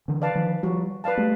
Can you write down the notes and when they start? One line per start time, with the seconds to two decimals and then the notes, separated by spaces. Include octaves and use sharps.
0.08 D3 E3
0.22 B4 D5 F5 A5
0.35 D#3 F3
0.63 F3 G3 F#4
1.04 B4 D5 F5 A5
1.17 G3 A3